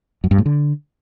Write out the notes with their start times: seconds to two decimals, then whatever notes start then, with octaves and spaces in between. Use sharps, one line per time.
0.24 F#2
0.31 G2
0.38 A2
0.46 D3